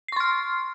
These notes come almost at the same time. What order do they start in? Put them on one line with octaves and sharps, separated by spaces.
C7 C#6 C6 F6